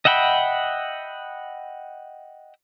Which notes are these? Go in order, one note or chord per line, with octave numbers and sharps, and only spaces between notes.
D#5 E5 F#5 G5 B5